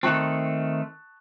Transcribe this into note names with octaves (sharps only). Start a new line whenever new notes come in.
D#3 A3 C4 A5 C#6 F#6